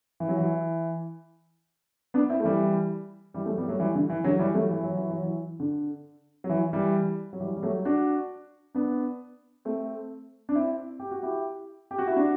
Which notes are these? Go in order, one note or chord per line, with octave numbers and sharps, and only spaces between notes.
E3
F#3
E3
B3 D4
C4 E4
A3
E3 G3
E3 G3
F#3 A3
G3 B3
F#3 A3
E3 G3
D3
E3
D3 F#3
E3 G3
F#3 A3
E3
F#3
E3
F#3
E3
D3
F#3
E3
E3 G3
F#3
E3 G3
G3
F#3 A3
D4 F#4
B3 D4
A3 C4
D4
C4 E4
G4
F#4
E4 G4
G4
F#4
E4
D4 F#4